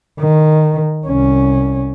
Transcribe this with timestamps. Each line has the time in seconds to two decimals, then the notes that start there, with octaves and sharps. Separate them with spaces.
0.20 D#3
1.07 C2 C#4